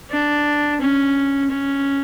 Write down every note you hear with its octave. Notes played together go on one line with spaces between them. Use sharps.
D4
C#4
C#4